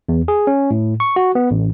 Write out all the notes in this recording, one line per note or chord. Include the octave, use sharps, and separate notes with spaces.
E2
G#4
C#4
A2
C#6
F#4
B3
A1